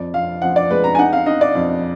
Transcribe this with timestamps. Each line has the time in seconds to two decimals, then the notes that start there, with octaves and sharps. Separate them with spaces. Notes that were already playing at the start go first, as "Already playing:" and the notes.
Already playing: F2 D5
0.14 F2 F5
0.42 F3 F#5
0.56 D5
0.71 G#3 B4
0.84 A#5
0.95 G#5
0.99 D#4 F#5
1.13 F5
1.26 D#4 D#5
1.41 D5
1.55 F2